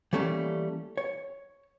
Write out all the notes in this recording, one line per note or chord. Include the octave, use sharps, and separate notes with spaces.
E3 G3 A3 A#3 C#4
C#5